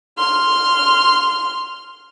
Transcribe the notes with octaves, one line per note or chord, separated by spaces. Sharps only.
C6 F6